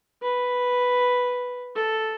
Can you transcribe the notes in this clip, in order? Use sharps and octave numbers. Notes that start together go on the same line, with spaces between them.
B4
A4